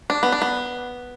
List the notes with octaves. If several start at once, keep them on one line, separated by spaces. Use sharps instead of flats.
D4
B3
D4
B3